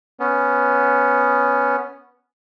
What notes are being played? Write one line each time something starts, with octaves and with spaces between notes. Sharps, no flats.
B3 C#4